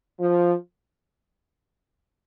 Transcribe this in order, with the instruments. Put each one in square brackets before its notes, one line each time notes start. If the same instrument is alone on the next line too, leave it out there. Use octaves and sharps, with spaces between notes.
[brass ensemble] F3